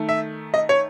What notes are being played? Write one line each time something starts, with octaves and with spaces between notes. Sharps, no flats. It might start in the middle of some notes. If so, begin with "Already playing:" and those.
Already playing: D#3 A3
E5
D#5
C#5